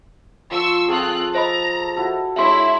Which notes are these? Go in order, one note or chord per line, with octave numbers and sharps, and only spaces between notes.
F3 C6 C#6 E6
C4 F4 G#4 A4 C#6 F#6
C5 D#5 A#5 B5
E4 F#4 A4
G#3 D4 E4 C#5 E5 C6